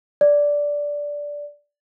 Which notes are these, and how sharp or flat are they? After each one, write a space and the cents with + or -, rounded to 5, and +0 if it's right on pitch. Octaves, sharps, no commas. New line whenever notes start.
D5 -10